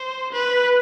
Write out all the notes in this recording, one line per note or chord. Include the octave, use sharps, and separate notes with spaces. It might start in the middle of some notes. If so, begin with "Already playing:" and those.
Already playing: C5
B4